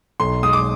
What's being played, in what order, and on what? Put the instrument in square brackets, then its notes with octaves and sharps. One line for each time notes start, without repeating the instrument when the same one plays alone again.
[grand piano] B1 [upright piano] C6
[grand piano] G#3 [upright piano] D#6
[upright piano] D6